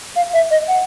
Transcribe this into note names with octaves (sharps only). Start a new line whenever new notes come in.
F5
E5
D#5
F#5